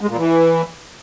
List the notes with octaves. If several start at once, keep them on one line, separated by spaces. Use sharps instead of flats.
G#3
A#2
E3